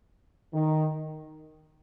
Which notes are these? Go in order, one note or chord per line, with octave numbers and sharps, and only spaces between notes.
D#3